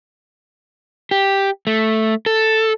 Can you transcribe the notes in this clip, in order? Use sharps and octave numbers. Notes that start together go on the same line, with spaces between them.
G4
A3
A4